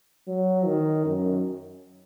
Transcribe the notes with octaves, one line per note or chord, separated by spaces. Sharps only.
F#3
D#3
F#2